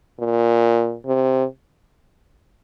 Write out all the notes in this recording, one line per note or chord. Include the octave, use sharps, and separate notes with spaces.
A#2
C3